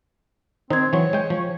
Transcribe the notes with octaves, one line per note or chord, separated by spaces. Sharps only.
D#3 C4 D#4 C5 G#6
E3 F#3 C#5
G#3 G5
F3